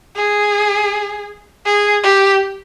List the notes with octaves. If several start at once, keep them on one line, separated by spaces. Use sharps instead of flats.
G#4
G#4
G4